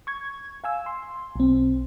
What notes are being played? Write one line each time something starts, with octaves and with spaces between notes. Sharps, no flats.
C#6 G#6
F5 G#5 E6
C6
B1 C4